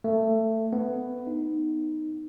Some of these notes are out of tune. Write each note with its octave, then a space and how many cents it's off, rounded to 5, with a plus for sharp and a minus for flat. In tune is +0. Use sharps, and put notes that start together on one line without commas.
A3 +20
B3 +10
D#4 -10